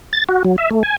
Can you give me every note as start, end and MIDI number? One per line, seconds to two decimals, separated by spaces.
0.13 0.24 93
0.29 0.43 66
0.45 0.56 54
0.58 0.69 76
0.71 0.83 57
0.83 0.96 80